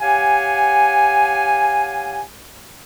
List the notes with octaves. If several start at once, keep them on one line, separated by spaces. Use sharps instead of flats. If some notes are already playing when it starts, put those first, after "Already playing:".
G4 C#5 F5 F#5 G#5